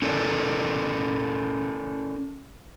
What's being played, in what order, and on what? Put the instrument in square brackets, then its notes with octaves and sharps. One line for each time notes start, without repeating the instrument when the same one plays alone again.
[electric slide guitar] C#4 E4 A4 A#4 D5